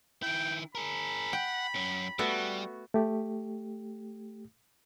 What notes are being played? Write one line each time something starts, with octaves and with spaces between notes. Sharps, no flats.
D#3 E4 G5
G#4 A#4 B5
F#5 G5
F#2 F#3
G3 A3 B3 F#4
A3 G4